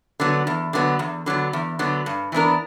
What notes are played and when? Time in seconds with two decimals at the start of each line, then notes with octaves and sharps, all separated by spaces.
0.20 D3 F#3 B3
0.47 E2
0.73 D3 F#3 B3
0.99 E2
1.26 D3 F#3 B3
1.53 E2
1.79 D3 F#3 B3
2.06 G2
2.32 E3 B3 D4 A#4